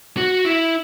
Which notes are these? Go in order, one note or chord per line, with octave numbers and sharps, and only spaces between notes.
F#4
E4